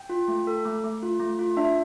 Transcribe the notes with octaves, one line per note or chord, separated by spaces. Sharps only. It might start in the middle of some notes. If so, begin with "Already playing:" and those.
Already playing: G5
F4
A3
A4
A3
A3
F4
A3
F4
D4 E5